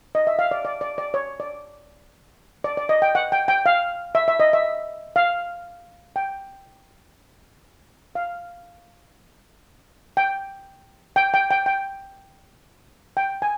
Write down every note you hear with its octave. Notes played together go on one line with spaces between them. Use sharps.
D#5
E5
F5
D5
D5
D5
D5
C#5
D5
D5
D5
D#5
G5
F#5
G5
G5
F5
E5
E5
D#5
E5
F5
G5
F5
G5
G5
G5
G5
G5
G5
G#5